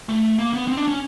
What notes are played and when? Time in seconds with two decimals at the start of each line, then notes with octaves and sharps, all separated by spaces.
0.09 A3
0.39 A#3
0.53 B3
0.68 C4
0.77 D4
0.88 C#4